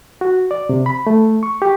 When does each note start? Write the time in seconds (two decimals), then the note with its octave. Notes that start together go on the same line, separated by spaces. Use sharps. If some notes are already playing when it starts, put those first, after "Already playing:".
0.21 F#4
0.51 D5
0.69 C3
0.86 B5
1.07 A3
1.43 C#6
1.62 G4